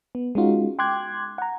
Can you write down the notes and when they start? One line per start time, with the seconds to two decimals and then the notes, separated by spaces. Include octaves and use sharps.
0.15 B3
0.35 G#3 C#4 D#4 F4 F#4
0.79 G5 C6 D6 F#6 G#6
1.38 F#5 A#5